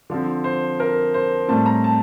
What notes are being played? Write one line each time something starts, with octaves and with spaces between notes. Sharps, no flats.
D3 F3 C4
C5
A#4
C5
A2 G3 C4 A5
A#5
A5